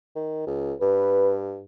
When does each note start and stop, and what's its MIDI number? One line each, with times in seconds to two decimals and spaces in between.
0.16 0.43 51
0.47 0.73 37
0.81 1.62 43
0.81 1.36 71